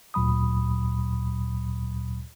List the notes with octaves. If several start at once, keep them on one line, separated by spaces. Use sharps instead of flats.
D2 A#2 F#3 B5 D#6